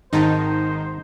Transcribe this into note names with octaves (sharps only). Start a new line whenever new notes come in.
G#1 G#2 D#3 D#4 C5 A5